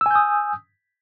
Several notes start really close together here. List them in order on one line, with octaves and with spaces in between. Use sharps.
E6 G#5 G6 D#6